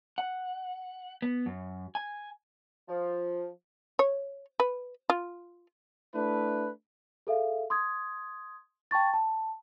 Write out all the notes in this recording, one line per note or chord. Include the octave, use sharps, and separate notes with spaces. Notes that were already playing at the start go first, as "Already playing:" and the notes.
F#5
B3
F#2
G#5
F3
C#5
B4
F4
A3 D4 E4 B4
G#4 A4 E5 F5
C6 D#6 G#6
G5 A5 C#6 A6
A5